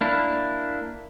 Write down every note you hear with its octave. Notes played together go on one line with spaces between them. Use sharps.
A#3 D4 E4